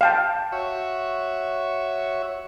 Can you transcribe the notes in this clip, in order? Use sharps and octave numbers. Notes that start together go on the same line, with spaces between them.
F5 G5 A5
F#4 C#5 E5